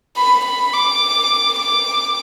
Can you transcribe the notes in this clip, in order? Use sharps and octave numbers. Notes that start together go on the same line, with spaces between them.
B5
B5
D6
D6